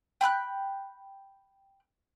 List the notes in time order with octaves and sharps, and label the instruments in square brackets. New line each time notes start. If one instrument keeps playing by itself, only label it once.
[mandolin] G5 B5 E6 F#6